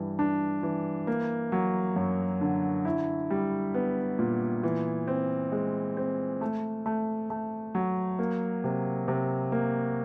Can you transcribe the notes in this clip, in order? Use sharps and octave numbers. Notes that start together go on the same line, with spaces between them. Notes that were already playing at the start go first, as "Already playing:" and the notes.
Already playing: G2 E3
D4
E3
A#3
F#3
F#2
D3
E4
G3
B3
A#2
E3
C4
G#3
C4
A3
A3
A3
F#3
A#3
C3
C3
A#3